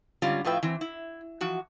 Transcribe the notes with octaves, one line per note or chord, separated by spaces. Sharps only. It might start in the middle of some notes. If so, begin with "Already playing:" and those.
G#2 D3 G3 C#4 F4
A2 F3 F4 B4 E5 G5
E3 C4
E4
E3 F3 F#4